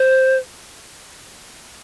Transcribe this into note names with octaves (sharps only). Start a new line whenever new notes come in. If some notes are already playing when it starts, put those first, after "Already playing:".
Already playing: C5